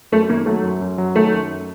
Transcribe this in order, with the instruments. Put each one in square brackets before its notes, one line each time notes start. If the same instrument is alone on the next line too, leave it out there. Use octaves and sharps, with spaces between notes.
[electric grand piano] F#2 [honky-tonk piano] A3
[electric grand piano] D#3 [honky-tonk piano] A#3
[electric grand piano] F#3 [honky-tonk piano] A3
[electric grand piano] F#2
F#2
F#3
[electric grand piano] D#3 [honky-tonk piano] A3
[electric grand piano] F#2